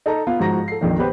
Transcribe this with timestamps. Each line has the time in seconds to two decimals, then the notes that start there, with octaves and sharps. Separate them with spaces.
0.06 D#4 A4 A5 A#5
0.27 B3 F4 F5
0.40 G#2 F3 F#4 A#5 A#6
0.68 A4 C7
0.81 A#1 F2 D#3
0.98 B3 G4 B4 C5